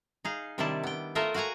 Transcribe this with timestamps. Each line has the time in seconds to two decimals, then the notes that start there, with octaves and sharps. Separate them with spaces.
0.25 D#4 G#4 F5
0.58 C3 D#3 G3 D4 E4 A5
0.83 B3 G5
1.15 A3 F4 A#4 D#5 E5
1.34 F#4 F5 F#5 G#5 A#5